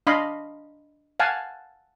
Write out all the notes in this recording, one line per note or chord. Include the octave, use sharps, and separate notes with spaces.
D4 D#5 F5 B5 C6
F5 F#5 G#5 A5